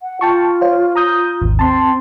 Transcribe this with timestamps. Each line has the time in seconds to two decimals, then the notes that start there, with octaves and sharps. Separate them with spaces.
0.02 F#5
0.21 F4 G5 A5 C#6
0.61 C5 C#5 F5
0.96 A#5 D#6 G6
1.42 G#1 D#2
1.59 C4 A5 C6